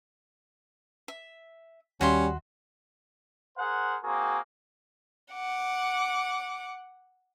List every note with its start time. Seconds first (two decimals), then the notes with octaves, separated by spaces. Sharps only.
1.08 E5
2.01 D#2 G3 C#4 F#4 E5 C6
3.58 G#4 A#4 C5 F#5
4.04 A#3 C4 F#4 G#4 A#4
5.33 F#5 D6